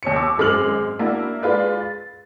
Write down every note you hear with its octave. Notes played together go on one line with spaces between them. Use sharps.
D#2 C#5 C#7
C#6 D6 E6
G#1 F#2 G#3 D6 F6 F#7
A#3 D4 E4 F#4
G#3 F4 B4 D5
A6